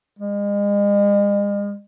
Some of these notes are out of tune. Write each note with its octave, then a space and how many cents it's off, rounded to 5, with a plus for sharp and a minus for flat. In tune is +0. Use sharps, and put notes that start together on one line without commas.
G#3 -40